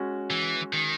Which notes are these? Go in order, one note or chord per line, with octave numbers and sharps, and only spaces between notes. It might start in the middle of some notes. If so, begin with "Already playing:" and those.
Already playing: G#3 C#4 F#4
E3
D#3